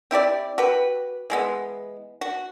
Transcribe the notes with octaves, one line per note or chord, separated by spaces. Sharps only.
C4 E4 G4 D5
F#4 G4 B4
E3 G#3 B3
F#4